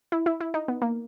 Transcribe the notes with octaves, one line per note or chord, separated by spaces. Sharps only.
E4
E4
E4
D#4
B3
A#3